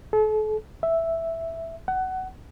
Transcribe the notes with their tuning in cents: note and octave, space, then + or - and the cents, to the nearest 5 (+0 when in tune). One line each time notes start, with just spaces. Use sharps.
A4 -40
E5 +0
F#5 +20